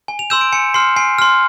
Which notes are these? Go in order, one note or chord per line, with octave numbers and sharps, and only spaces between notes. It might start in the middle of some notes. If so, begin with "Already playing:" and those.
G#5
F7
C6 E6 G6 E7
D7
G#5 C#7
C6 F6 C7
G#5 C7
C6 F6